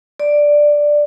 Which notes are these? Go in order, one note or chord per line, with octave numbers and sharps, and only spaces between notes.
D5